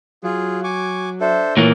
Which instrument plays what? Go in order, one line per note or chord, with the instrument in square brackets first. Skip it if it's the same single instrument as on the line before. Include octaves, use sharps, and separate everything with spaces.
[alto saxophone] F#3 [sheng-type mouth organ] F4 G#4
[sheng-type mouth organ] G#5 C#6 D6
[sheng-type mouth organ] D4 A4 C5 [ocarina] E5
[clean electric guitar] A#2 E3 A#3 [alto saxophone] C#5